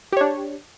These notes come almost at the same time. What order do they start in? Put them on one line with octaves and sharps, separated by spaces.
G4 C#5 D4